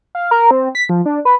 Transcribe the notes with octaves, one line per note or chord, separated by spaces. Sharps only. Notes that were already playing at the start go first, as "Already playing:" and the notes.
F5
A#4
C4
B6
F3
D4
B4